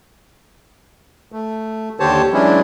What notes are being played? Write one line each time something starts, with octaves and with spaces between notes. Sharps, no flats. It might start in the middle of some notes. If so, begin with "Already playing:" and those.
A3
D#2 D3 G4 C5 C#5 A5
E3 F#3 G#3 C#4 D4 E4